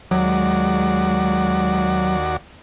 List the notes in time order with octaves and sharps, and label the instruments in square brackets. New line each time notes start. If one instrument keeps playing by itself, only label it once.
[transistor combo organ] D#2 F#4 D5 [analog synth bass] F#3 [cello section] G#3